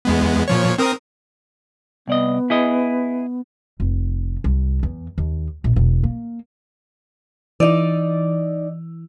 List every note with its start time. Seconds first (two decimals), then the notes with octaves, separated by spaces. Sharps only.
0.05 E2 G#3 B3
0.48 A#2 F3 C#5
0.78 C4 A#4 D#6
2.08 C2 B3 D5 D#5
2.50 E4 G#4 D#5
3.80 F1
4.44 C2
4.83 E2
5.18 D#2
5.64 A#1
5.76 E1
6.03 A#3
7.60 E3 D#4 D5